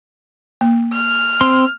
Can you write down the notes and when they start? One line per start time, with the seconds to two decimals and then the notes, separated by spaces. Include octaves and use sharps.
0.61 A#3
0.93 F6
1.41 C4 C6